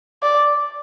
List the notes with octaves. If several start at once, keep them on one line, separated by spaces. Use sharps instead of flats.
D5